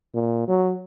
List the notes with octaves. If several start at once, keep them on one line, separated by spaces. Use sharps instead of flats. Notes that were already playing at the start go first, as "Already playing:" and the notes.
A#2
F#3